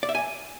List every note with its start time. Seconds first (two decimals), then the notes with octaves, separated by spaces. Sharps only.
0.03 D5
0.09 E5
0.15 G#5